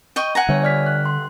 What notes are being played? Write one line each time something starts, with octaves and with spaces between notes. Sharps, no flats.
D#5 G5 C#6
F#5 G#5 A#5
D3 G3 C#5 E5
D5 F6 B6
F#6
C6